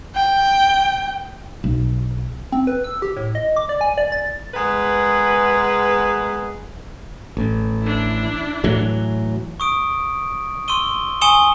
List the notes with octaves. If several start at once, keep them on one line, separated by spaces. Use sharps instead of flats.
G5
B1
C4
B4
E6
G4
A2
D#5
D6
D5
G#5
D5
A6
G#3 B3 G#4 A#4 B4
A1
D4 E4
A2 E3 F#3
C#6 D#6 D7
C6 C#6 E6 D#7 G7
G#5 C#6 D#6 C#7 E7 G7